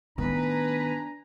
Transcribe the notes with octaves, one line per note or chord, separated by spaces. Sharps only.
A2 D#3 B3 D4 B4 G#5 A#5